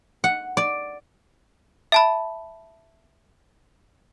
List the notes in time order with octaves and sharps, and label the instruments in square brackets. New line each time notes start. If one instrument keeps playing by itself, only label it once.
[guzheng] F#5
D5
[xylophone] E5 A5 B5